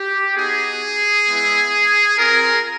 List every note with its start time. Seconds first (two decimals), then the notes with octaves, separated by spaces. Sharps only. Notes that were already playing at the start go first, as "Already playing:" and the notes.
Already playing: G4
0.36 B3 D#4 F#4 G#4
1.28 G#3 B3 E4
2.19 C4 F4 G#4 A#4